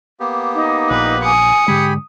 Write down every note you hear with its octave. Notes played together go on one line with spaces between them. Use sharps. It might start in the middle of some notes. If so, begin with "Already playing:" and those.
A#3 B3 G4
D#4
A#1 B4
G#5 D#6 C#7
G#2 D3 G#3 G4 G#5 B5